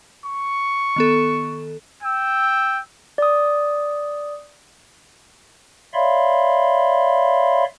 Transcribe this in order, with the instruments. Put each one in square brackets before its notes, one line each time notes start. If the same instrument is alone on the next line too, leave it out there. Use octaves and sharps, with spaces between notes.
[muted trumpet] C#6
[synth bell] D#3 B3 A4
[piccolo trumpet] G5 [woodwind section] E6
[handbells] D5 D#6
[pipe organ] C#5 D5 E5 F5 B5 C6